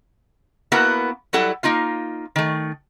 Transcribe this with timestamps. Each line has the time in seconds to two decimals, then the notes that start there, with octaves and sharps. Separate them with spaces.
0.72 A#3 B3 E4 F#4 A#4 F#5
1.33 F#3 G3 E4 A4 F#5
1.63 A#3 D#4 F4 F5
2.36 D#3 A3